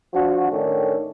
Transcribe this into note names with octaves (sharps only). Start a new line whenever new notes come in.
F3 D4 F#4
A2 D#3 C#4 D4 A4